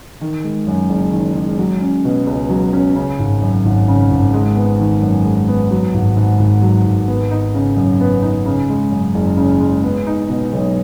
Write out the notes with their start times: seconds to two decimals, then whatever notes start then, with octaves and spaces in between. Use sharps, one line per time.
0.21 D#3
0.44 G#3
0.67 F#2
0.89 F#1
1.13 D#3
1.35 G#3
1.59 F#3
1.81 C#4
2.05 B2
2.27 C#2
2.50 F#3
2.73 C#4
2.96 C#3
3.19 G#1
3.42 F#2
3.65 G#1
3.88 C#3
4.11 G#1
4.34 G#3
4.56 B3
4.79 D#3
5.02 F#2
5.25 G#3
5.48 B3
5.71 F#3
5.94 G#1
6.17 G#2
6.39 G#1
6.62 F#3
6.86 G#1
7.08 B3
7.31 D#4
7.54 C#3
7.77 F#2
8.00 B3
8.22 D#4
8.46 C#3
8.69 G#3
8.91 F#2
9.15 F#1
9.37 C#3
9.60 G#3
9.84 B3
10.07 D#4
10.30 B2
10.53 B1